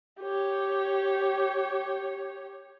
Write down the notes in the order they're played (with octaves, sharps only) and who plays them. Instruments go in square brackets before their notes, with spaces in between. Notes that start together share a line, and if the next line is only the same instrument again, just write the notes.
[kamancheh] G4 C#5